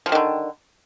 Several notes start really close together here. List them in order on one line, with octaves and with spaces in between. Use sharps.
F3 G3 D#3 D3